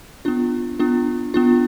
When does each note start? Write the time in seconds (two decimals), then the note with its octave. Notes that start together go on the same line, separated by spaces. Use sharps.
0.25 B3 D4 F4
0.79 B3 D4 F4
1.34 B3 D4 F4